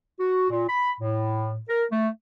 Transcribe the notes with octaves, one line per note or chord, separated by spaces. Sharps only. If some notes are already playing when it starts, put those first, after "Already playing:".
F#4
A#2
B5
A2
A#4
A3